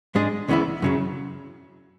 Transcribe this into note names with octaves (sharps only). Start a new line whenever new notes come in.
G#2 G#3 D4 G#4
D2 C#3 E3 B3 E4
F#2 C#3 F#3